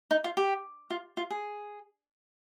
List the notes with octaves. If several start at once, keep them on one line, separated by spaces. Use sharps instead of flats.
D#4
F4
G4
F4
F4
G#4